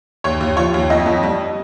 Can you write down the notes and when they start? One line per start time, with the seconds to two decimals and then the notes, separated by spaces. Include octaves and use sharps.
0.24 D#2 C#5
0.41 D#2
0.57 F3 C#5
0.74 D#2
0.90 F2 D#5
1.06 F2
1.23 G3